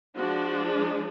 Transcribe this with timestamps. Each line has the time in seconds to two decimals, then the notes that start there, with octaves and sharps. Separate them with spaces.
0.16 F3 G#3 D4 F#4
0.67 G#4